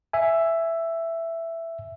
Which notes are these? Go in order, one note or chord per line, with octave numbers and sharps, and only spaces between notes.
E5 G#5